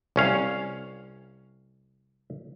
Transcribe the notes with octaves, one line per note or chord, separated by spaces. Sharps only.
C2 C#4 F5